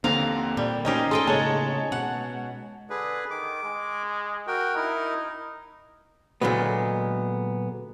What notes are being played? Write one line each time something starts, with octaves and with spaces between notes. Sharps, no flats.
D#2 D3 A#3 C4 D4 F5 A#5
A#2 G3
C#4 D#4 G4 C5 D#5
G#4 A4 D#5 G5 C6
A2 C#3 G#3 A#3 C#5 A5
B2 F#5
D3 G#4 B4
D#3 D6
G#3
F#4 A#4 G5
D#4 E4 A#4
A#2 D3 F#3 G#3 B3